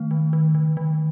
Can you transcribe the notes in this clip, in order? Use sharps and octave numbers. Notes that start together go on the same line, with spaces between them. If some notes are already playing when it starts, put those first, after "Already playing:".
Already playing: D#3 A3
D#3
D#3
D#3
D#3